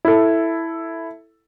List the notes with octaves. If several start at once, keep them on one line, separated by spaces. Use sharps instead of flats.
E4 A4